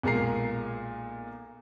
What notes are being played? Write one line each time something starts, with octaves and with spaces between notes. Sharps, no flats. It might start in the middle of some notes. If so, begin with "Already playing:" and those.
B1 A#2 G#3 A#3 A#5 C7